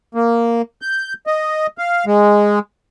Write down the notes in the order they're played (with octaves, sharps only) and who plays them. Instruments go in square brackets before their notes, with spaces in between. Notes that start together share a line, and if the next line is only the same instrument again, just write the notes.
[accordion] A#3
G6
D#5
F5
G#3